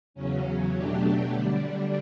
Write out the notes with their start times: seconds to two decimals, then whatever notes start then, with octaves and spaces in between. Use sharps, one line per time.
0.14 E2 C#3 F#3 C#4
0.73 B2 F#3 A3 D4 G4
1.31 D3 G3 D4